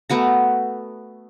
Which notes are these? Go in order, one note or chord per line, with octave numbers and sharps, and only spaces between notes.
A3 B3 F#4 A#5